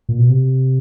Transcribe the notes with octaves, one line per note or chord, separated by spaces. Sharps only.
A#2
B2
C3